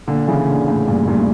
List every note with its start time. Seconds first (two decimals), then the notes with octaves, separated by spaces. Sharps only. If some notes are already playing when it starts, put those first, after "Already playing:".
0.08 A#2 D3
0.28 C#3 E3
0.48 A#2 D3
0.68 A2
0.87 G2 A#2
1.08 G2 A#2
1.19 A2